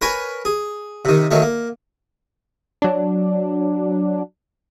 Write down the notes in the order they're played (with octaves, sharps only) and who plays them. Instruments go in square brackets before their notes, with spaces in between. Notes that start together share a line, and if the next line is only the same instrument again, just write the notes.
[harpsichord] A#4 B4 C#5 G#5
G#4
C3 D#3
D#3 F#3 A3
A#3
[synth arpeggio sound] F#3 D4